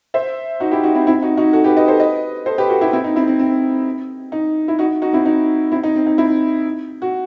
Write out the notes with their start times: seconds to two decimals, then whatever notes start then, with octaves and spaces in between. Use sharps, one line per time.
0.14 C5 E5
0.60 D#4 F#4
0.72 E4 G4
0.83 D#4 F#4
0.95 C4 E4
1.07 C4 E4
1.22 D#4 F#4
1.37 D#4 F#4
1.53 F#4 A4
1.64 G4 B4
1.76 B4 D#5
1.88 A4 C5
2.00 B4 D#5
2.46 A4 C5
2.58 G4 B4
2.69 F#4 A4
2.81 E4 G4
2.93 C4 E4
3.04 D#4
3.16 C4 E4
3.28 C4
3.39 C4
4.32 D#4
4.68 E4
4.79 D#4 F#4
5.02 D#4 F#4
5.13 C4 E4
5.25 D#4
5.72 C4 E4
5.83 D#4
5.95 C4
6.07 D#4
6.18 C4 E4
7.02 F#4